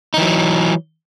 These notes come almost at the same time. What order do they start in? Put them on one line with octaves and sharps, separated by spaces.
D#4 E3 F#3